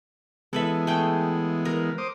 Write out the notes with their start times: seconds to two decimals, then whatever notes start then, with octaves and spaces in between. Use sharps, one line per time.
0.53 E3 G#3 B3 A4 B4 E5
0.87 A3 G#4 G5
1.65 A#4
1.98 C5 D6 D#6